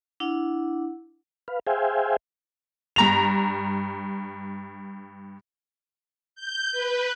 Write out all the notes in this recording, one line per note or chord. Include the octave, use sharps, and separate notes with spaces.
D4 E4 F#5
B4 F5
G#4 C5 E5 F5 G5 G#5
G2 A#5 F7
G6
B4